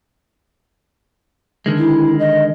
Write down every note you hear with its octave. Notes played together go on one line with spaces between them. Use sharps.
D3 D#3 G#3
E4
D#5